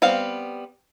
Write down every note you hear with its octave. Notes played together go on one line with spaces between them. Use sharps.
G3 B3 C4 F5